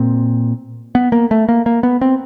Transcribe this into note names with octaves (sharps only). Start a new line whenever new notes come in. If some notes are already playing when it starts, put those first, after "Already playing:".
Already playing: A#2 C4
B3
A#3
A3
A#3
A#3
B3
C4